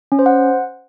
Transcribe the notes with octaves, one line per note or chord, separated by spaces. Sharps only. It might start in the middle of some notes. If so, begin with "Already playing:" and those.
C#4
C5
F#5